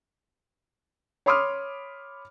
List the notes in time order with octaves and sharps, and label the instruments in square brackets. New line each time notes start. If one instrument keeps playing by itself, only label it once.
[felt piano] C#5 B5 C6 D6 D#6 F6